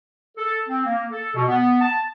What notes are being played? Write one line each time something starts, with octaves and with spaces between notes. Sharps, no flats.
A4
C4
A#3
A4
B2
B3
A5